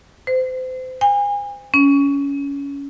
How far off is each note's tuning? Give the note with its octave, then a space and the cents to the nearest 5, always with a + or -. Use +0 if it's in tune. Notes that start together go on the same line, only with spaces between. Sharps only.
C5 -30
G#5 -35
C#4 +20